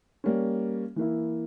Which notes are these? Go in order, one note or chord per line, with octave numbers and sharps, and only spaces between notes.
G3 A#3 C#4
E3 A#3 E4